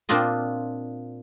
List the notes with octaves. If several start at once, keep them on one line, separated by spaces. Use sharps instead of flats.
A#2 C4 D4 F4 D#5